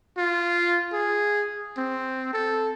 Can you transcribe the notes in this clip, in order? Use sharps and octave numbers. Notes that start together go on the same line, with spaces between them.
F4
G#4
C4
A4